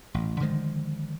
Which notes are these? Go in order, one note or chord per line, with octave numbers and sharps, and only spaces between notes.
A1
D3 D#3 F3 G#3